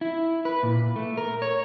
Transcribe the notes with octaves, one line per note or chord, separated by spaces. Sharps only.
E4
B4
A#2
A3
A#4
C#5